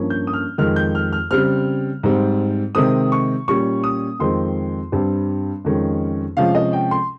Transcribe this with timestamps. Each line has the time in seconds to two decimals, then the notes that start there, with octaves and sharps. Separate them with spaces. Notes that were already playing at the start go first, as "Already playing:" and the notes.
Already playing: G2 F3 A#3 C#4
0.10 G6
0.27 D#6
0.33 F6
0.58 F2 D#3 G#3 F6
0.76 G6
0.95 F6
1.13 F6
1.31 C#3 G3 C4 F6
2.03 G#2 G3 C4
2.75 C3 D#3 G#3 C4 D#6
3.12 C#6
3.48 A#2 G3 C#4 C#6
3.84 D#6
4.19 F2 D#3 G#3 C4 C6
4.92 G2 G3 C4
5.65 F2 D#3 G#3 C#4
6.37 C3 F3 G#3 C#4 F5
6.55 D#5
6.73 G5
6.91 C6